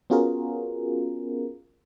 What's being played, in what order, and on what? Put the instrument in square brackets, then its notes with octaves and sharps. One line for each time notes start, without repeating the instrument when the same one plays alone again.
[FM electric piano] B3 C#4 F4 F#4 G#4 A#4